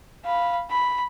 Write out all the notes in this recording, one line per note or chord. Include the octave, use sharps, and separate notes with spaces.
F5 B5
B5